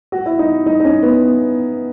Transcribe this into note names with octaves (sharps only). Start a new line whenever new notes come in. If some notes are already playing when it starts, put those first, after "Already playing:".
F#4
E4
D#4
D#4
D#4
C#4
B3